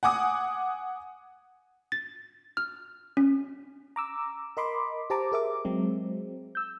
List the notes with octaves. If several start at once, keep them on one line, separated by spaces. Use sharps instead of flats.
F#5 G#5 D6 D#6
A6
F6
C#4
A#5 D6 E6
A#4 D#5 B5 C6 D6
G4 C5 A5 A#5 D6
G#4 A#4 E5 D6
F#3 G#3 C4
E6 G6